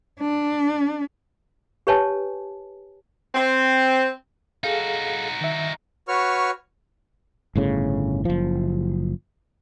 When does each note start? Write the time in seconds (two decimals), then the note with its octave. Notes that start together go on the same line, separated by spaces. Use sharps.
0.20 D4
1.87 G4 B4 C#5 G#5 A5
3.35 C4
4.64 D#4 F#4 G#4 A4 F5
5.41 D#3 E5
6.08 F#4 B4 C#5 C#6 F6
7.56 G1 A2 C#3
8.25 F#1 F3